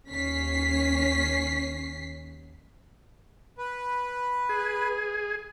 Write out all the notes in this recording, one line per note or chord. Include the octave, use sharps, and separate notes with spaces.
D#2 C#4 B6 C7
B4
G#4